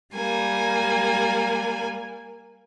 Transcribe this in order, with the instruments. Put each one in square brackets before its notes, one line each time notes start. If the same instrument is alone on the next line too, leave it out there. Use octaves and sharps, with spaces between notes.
[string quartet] G3 A#3 G#5